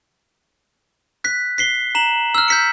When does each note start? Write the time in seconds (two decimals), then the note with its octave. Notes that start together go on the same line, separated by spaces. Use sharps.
1.24 F#6 B6
1.58 B6 C7 G7
1.95 A#5 E7 F#7
2.35 E6 F6
2.48 G6 B6 C#7